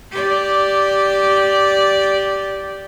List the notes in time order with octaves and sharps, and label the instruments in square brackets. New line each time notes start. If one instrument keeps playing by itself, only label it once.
[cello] G4 D5